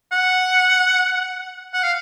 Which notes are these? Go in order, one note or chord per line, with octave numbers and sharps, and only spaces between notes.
F#5
F#5
F5